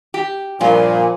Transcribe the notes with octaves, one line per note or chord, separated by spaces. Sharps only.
G4
G2 A#2 F3 F4 G#5